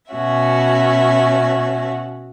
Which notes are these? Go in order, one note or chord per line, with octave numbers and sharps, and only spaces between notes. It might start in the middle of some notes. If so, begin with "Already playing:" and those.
B2 C#4 F#4 E5